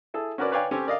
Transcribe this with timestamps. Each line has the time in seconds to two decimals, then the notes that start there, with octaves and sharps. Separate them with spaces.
0.14 E4 G#4 A4
0.38 C#4 F#4 A#4 B4 D5
0.52 B4 C#5 D5 F5 G5 G#5
0.71 C4 C#4 G4 A4 C#5
0.86 A#4 D5 D#5 F5